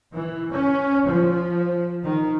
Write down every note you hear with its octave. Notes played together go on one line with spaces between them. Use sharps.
E3
C#4
F3
D#3